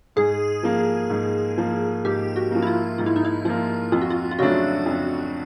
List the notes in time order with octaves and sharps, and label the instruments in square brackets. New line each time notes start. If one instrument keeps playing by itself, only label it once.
[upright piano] G#2 [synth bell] G#4
[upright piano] F3 A#3
G#2
F3 A#3
[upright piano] G#2 [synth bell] G4
[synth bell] F#4
[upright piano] F3 A#3
[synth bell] E4
F4
[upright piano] G#2 [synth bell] F4
[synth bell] E4
D#4
E4
[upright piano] F3 A#3 [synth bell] F4
[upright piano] F2 [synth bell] F4
[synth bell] F#4
F4
F4
[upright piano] C#3 F#3 A3 D4 [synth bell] F#4
[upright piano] F2